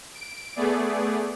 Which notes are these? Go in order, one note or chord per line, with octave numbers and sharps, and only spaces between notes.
D7
A3 B3 G#4 D5